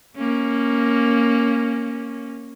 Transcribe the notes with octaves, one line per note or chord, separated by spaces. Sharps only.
A#3 C#4